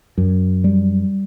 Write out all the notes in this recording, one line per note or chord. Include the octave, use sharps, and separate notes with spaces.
F#2
G3